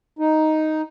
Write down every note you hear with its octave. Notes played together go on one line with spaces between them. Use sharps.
D#4